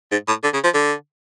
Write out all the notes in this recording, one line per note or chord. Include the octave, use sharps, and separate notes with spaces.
G#2
A2
D3
C#3
F3
D3